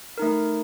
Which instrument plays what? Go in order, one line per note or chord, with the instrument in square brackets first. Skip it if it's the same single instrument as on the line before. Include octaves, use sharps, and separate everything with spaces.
[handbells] A3 D#4 A#4